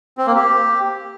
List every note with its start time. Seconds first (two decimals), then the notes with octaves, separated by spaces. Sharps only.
0.18 C4
0.27 A#3
0.35 G4